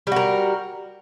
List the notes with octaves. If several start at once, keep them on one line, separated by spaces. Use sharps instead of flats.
G3 F#4 A#4